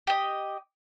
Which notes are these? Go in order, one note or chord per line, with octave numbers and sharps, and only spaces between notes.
G4 D#5